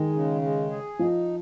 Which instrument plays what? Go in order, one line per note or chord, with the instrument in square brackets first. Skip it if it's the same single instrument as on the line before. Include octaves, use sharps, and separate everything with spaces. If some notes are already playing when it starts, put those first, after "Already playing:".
Already playing: [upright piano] D#3 [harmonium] G#3
[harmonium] C#3
G#3
G#4
[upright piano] F3 [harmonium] D#4